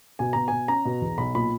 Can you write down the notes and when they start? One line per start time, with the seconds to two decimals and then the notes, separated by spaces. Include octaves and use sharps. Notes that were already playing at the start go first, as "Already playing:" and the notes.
0.19 B2 G#5
0.33 B2 A#5
0.48 B2 G#5
0.68 C#4 A#5
0.85 B2
1.01 E2
1.18 B1 B5
1.34 A#2 B5